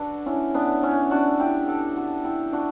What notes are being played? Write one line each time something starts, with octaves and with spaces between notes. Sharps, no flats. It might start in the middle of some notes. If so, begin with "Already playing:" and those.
Already playing: D4 F#4 A4 B4
C#4 E4
B3 D4
C#4 E4
D4 F#4
E4 G4
F#4 A4
F#4 A4
E4 G4
D4 F#4